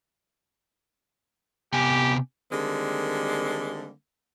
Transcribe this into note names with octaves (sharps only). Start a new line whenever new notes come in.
C3 B3 G4 G#5
D3 D#3 G3 G#3 A#3 C4